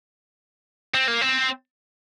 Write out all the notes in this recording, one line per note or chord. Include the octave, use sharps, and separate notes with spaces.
C4
A#3
C4